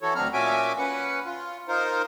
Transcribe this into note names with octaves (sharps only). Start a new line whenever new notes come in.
E3 E4 F#4 A4 C#5
D2 F#3 C4 D4 A#5 F6
A#2 C#4 F#4 E5 G#5 D6
C#4 B4 F#5
F4
D#4 F4 A#4 C5